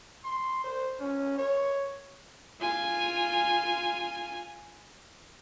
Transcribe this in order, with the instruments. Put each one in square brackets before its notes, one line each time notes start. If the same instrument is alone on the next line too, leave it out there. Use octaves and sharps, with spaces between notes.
[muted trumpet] C6
C5
C#4
C#5
[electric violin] F4 G#5